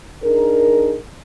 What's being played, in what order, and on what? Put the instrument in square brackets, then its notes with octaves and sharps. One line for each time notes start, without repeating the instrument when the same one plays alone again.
[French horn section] D4 D#4 G#4 A#4